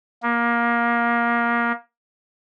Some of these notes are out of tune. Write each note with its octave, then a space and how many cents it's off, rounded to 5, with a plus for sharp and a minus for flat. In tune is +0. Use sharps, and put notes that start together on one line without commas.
A#3 +20